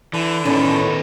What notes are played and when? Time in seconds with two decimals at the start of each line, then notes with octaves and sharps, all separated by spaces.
0.13 D3 E3
0.46 A2 D#3 B3 C#4 D#4